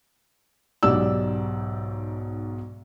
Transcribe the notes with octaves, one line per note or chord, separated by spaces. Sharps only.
B1 G#2 G4 D5 E6